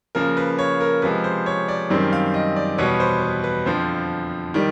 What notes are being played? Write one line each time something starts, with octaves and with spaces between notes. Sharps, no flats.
C#3 F3 A#3 A#4
B4
C#5
A#4
C3 F3 G#3 B4
C5
C#5
D5
F#2 D#3 G3 C4
F5
D#5
D5
E2 B2 G3 B3 C#5
C5
B4
B4
F2 D3 F3 C5
D#3 G3